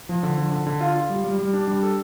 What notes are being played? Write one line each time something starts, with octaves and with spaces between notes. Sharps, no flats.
F3
D3
F3
D3
D3
F4
F4
G3
G3
G3
D4
G3
A4